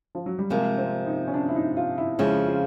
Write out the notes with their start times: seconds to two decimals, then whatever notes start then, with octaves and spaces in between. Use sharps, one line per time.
0.15 F3
0.26 F#3
0.39 G3
0.50 C3 F3 G#3 A#3
0.78 C4
1.06 D#4
1.28 C#4
1.34 D4
1.49 E4
1.56 D#4
1.77 F4
1.98 E4
2.19 F2 C#3 F3 G#3 C#4 E4
2.47 F4